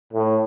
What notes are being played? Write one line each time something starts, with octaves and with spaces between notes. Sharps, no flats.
A2